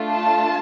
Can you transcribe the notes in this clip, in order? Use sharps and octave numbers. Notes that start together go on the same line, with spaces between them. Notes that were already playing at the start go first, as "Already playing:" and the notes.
Already playing: A3 D4 F4
A5